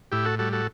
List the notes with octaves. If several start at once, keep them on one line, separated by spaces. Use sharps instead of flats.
A2 E4 G4
F#4 A4
G3 F#4 A4
F#4 A4